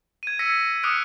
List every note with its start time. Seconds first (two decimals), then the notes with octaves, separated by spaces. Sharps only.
0.23 G#6 D#7
0.39 E6 A#6 B6 C#7
0.83 D6 D#6 F6 F#6 C#7 D7